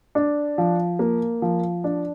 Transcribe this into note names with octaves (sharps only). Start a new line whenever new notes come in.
D4
F3
A#3
F3
D4